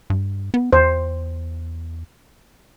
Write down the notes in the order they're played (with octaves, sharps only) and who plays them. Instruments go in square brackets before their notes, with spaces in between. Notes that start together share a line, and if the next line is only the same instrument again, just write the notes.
[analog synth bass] G2
B3
[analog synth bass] E2 [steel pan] C5